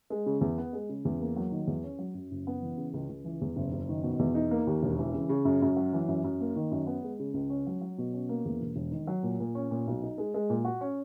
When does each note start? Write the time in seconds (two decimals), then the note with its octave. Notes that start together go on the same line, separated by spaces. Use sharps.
0.10 G#3
0.26 C#3
0.41 E2
0.58 B3
0.73 G#3
0.89 C#3
1.05 E2
1.21 A#3
1.36 F#3
1.51 D#3
1.67 E2
1.84 C#4
1.99 F#3
2.14 F#2
2.31 F#1
2.47 B3
2.62 E3
2.77 C#3
2.94 C#2
3.09 C#2
3.25 E3
3.41 E2
3.56 F#1
3.72 F#1
3.89 D#3
4.03 B2
4.19 E2
4.35 D#4
4.51 A#3
4.67 D#2
4.83 E1
4.98 E3
5.14 C#3
5.29 C#3
5.45 F#2
5.62 F#2
5.76 F#3
5.93 E3
6.08 F#2
6.24 F#2
6.41 A#3
6.56 D#3
6.71 F#2
6.87 B3
7.03 G#3
7.19 C#3
7.34 C#2
7.50 C#4
7.66 F#3
7.81 F#3
7.98 B2
8.13 C#4
8.29 A#3
8.45 E2
8.61 E1
8.76 E1
8.91 D#3
9.07 F#3
9.23 A#2
9.40 A#2
9.55 C#4
9.71 A#2
9.87 B1
10.03 D#4
10.18 G#3
10.34 G#3
10.50 A#2
10.65 F#4
10.81 C#4